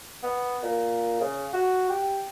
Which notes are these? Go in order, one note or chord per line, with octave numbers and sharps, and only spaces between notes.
B3
A#2
C#3
F#4
G4